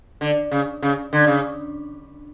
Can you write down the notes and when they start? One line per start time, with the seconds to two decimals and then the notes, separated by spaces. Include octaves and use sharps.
0.21 D3
0.52 C#3
0.83 C#3
1.13 D3
1.27 C#3